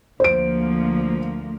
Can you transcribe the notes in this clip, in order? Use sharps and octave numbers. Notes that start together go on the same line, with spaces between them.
D2 F3 A#3 C5 D7